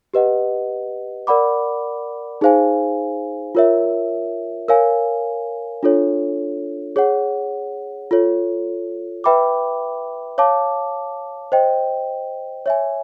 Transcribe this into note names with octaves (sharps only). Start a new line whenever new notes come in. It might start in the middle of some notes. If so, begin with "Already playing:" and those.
G4 B4 D#5 F#5
A#4 D5 F#5 B5 D6
D#4 G#4 C5 F5 G#5
F4 A#4 C#5 E5
A#4 C#5 F5 G#5
D4 F4 A4 C#5
G#4 C#5 F#5
F4 A4 C#5
B4 E5 G5 B5 D6
C#5 F5 A5 D6
C5 D#5 G5
C#5 E5 G#5